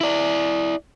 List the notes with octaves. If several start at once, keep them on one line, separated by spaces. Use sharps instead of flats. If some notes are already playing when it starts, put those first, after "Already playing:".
E4 D5